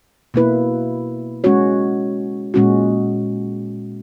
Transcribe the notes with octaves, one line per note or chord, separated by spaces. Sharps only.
B2 A#3 E4 B4
G#3 C#4 F#4 C#5
A#2 G#3 C#4 F#4